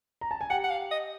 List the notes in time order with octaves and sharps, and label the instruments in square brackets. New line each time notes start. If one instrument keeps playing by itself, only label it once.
[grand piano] A#5
A5
G#5
[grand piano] G4 G5 [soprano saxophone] F#5
[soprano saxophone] F#5
F5
D#5